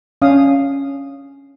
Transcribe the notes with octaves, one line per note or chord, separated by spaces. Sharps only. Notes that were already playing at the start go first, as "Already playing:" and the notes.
C#4 D4 F5 D#6